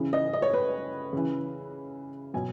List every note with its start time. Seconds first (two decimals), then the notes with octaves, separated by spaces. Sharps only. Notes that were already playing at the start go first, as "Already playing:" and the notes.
Already playing: C#3 E3
0.13 D#5
0.33 D#5
0.42 C#5
0.53 B4
1.13 C#3 E3
2.34 B2 F#3 G#5